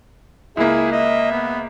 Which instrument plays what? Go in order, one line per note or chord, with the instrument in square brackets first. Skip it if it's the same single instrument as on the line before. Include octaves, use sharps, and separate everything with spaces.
[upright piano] C#2 A#3 [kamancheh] E4 [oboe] G#4
[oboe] D#5 [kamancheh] E5
[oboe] B3